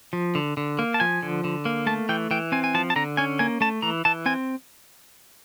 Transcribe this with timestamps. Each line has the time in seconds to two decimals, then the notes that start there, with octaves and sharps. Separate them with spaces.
0.13 F3
0.35 D3
0.57 D3
0.79 A#3
0.94 A5
1.00 F3 G#5
1.23 D3
1.44 D3
1.65 A#3
1.87 A3 A5
2.09 E3 G5
2.31 E3 G5
2.52 C4 G#5
2.64 G#5
2.74 F3 A5
2.90 A5
2.96 D3 A#5
3.17 C#4 G#5
3.39 A#3 G#5
3.61 A3 A5
3.82 E3 A#5
4.05 E3 A5
4.26 C4 G#5